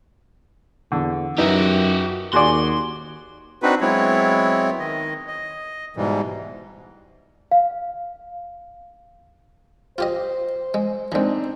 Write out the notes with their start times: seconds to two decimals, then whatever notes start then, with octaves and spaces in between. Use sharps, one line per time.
0.92 E2 D3
1.38 F#2 E3 D#4 E4 F#4 G4
2.33 D#2 F#4 G#4 D5 C6
3.62 C4 D4 D#4 F#4 B4
3.81 F#3 G#3 B3 C4 E4 C#5
4.79 D#3 D#5
5.28 D#5
5.96 G#2 B2 E3 G3
7.51 F5
9.98 F4 G4 C5 D#5
10.74 G#3
11.12 E3 G#3 C4 D4 D#4